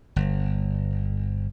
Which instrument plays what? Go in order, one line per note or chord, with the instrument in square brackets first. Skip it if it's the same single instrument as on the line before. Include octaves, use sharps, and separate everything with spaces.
[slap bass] G1